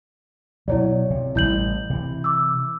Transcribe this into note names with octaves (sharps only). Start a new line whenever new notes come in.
B2 F#3 E4 C#5 D5
C3
A1 G3 E4 G6 F#7
C3 E3
D6 E6